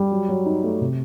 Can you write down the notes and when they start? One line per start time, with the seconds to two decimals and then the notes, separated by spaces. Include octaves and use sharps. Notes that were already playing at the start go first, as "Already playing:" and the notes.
Already playing: G3
0.11 F#3
0.28 F#3
0.46 D#4
0.63 A3
0.81 C3